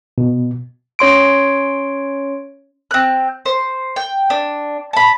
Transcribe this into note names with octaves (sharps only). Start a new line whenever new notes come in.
B2
C#4 C#5 C6 D7
C4 F#6
C5
G5
D4
A5 B5